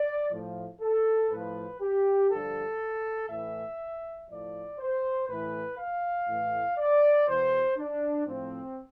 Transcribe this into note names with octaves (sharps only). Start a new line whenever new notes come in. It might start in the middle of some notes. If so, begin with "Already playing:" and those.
Already playing: D5
A2 F3
A4
A2 F3 B4
G4
G2 D3 F3 A4
A2 E3 E5
A2 F3 D5
C5
A2 E3 B4
F5
A2 E3
D5
E2 B2 C5
D4
A2 F3 C4